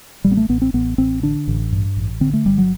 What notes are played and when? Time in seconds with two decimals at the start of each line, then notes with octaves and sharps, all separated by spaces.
0.24 A1 G3
0.31 B3
0.37 A3
0.49 A1 B3
0.62 C4
0.74 A1 B3
0.98 A1 C4
1.23 D3 D4
1.48 A1
1.72 G2
1.97 A1
2.21 D3 C4
2.34 A3
2.46 G1 G3
2.58 F#3